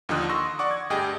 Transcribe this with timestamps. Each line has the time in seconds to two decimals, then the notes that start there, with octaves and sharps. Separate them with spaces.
0.09 D#2 D3 F3 D#4 D#6 F#6
0.29 C6 C#6 E6 A#6
0.59 D5 F#5 C#6 D6
0.71 G#6
0.90 D2 G2 G4 G#4 D#5 G5